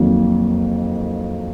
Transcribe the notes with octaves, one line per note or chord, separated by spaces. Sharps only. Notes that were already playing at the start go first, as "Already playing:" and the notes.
Already playing: F2 D#3 F#3 A#3